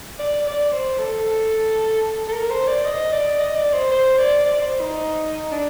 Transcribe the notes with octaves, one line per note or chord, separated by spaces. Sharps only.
D5
D5
C5
A4
A4
A#4
C5
D5
D#5
D5
D#5
D5
C5
C5
D5
D5
C5
D#4
D4